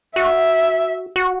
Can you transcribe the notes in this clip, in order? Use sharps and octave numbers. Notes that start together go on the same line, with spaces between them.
F#4 E5
F#4